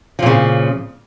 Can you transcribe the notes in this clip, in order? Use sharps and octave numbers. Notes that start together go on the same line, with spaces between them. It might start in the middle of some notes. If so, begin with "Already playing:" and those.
A#2 C#3 F3